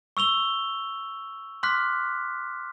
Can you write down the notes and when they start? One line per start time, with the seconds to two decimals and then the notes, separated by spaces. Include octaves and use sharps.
0.17 C#6 E6 F7 G7
1.63 C6 D6 F6 F#6 B6